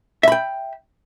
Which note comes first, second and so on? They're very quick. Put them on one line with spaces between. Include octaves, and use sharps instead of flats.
E5 B5 G5